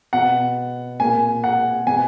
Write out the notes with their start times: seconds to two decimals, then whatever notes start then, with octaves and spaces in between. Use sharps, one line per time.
0.13 B2 F#5
1.00 A#2 G#5
1.44 F#5
1.87 B2 G#5